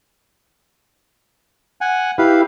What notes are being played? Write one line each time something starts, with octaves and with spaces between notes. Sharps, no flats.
F#5 G#5
E4 G4 B4 F5